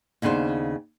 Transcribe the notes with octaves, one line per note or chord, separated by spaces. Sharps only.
D#2 C#3 B3 D4 C5